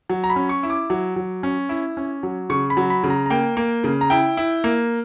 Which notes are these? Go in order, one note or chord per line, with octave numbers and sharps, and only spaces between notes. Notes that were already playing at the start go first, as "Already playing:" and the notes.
F#3
A#5
B5
C#4
C#6
E4
D6
F#3
F#3
C#4
E4
C#4
F#3
C#3 C#6
B5
F#3
B5
C#3
A#5
A#5
A#3 G5
A#3
C#3
A#5
E4 G5
E4
A#3